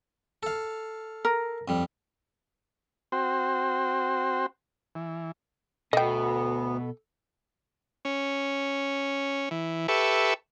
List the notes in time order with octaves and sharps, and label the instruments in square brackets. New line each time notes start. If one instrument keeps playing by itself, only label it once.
[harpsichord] A4 F5
[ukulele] A#4
[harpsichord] F2 G3
[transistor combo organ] C4 F#4 C5 G5
E3
[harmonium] D2 B3 [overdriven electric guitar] B2 [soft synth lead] A4 [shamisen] D#5 G5
[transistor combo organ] C#4
E3
G4 A4 B4 E5 C#6